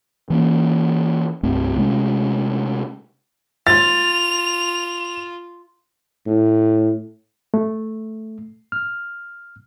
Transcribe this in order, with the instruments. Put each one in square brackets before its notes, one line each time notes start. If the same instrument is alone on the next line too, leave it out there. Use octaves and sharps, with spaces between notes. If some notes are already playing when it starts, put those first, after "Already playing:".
[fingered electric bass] E3 A#3 C#4
C2 G2 A3 C4
C3 G#3 A3 C#4
[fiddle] F4 [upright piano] A6 [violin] F7
[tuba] A2
[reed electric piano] A3
F6